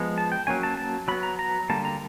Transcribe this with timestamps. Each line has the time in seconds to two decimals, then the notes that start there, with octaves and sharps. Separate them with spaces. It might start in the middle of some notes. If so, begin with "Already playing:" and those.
Already playing: F3 G#3 B3
0.18 A5
0.32 G5
0.47 F#3 A#3 C#4 G#5
0.63 A5
0.77 A5
1.08 F#3 B3 B5
1.23 A#5
1.39 A#5
1.70 D3 G3 A#3 A5
1.85 A#5